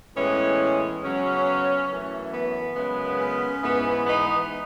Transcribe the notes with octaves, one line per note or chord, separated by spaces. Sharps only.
A2 E3 G#3 B3 C#4
C#3 F#3 B3 C#4
F#2 E3 A3
B3
F#2 C#3 G#3 B3
C#4
G#2 E3 B3
B3 D#4